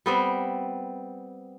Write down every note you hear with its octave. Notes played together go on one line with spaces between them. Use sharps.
G3 B3 C4